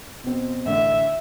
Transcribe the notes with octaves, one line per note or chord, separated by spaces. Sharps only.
B2 C4
A1 D3 E5